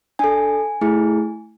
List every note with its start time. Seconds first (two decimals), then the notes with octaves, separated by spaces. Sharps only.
0.19 D4 A4 G#5
0.81 A3 E4 G#4